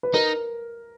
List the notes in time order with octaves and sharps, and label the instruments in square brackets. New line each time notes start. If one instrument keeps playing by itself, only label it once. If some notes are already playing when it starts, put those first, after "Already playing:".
[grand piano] B4
[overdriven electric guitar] D#4 [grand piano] A#4